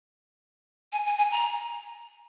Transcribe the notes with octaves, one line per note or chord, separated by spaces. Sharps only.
G#5
G#5
G#5
A#5